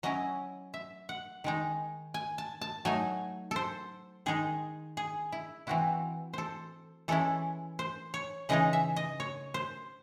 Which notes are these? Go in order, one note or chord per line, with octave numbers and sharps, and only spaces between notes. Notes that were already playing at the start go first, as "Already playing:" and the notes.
F#3 C#4 E4 D#5
E5
F#5
D#3 G#3 D#4
G#5
A5
A5
F#3 A3 D#4 G#5
A4 C5
D#3 G#3 D#4 G#4
G#4
E4
E3 C4 E4 F#4
A4 C5
E3 G#3 C#4 E4 A4
C5
C#5
C#3 E3 G#3 D#4 D#5
E5
D#5
C#5
C5